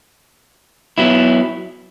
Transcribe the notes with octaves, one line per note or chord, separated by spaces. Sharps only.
F#3 B3 E4